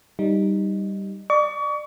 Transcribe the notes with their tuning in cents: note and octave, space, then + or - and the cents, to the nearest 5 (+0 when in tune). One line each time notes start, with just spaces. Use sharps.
G3 +0 D#4 +0
D5 +30 C#6 +35